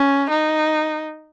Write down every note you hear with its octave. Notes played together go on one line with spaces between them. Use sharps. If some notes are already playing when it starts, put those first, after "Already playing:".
Already playing: C#4
D#4